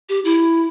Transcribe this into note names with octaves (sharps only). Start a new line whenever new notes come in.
G4
E4